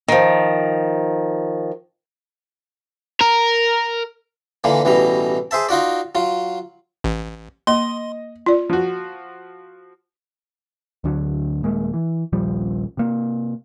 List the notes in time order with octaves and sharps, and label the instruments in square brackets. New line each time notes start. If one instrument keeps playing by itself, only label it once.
[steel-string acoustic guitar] D#3 F3
[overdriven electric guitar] A#4
[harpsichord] A#2 D3 E3 A#3
A1 B2 E3 G3 A#5
G#4 C5 E5 A5
D#4 F4 F#4 D5
F#3 F4
[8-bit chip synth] A1
[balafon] A#3 [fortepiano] D#5 [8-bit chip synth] C6
[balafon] F4 D5
[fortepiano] F3 F#4
[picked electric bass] D2 D3 F#3
D#1 G#3 A#3
E3
D#1 A#1 F3 G3
C3 A#3